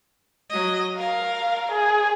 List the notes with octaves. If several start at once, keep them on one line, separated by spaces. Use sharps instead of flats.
F#3 D#5
A#4 F5
G#4